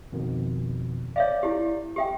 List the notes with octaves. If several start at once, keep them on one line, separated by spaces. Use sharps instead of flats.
F2 B2 D#3
C#5 D5 E5 F5
E4 G4
G4 E5 G5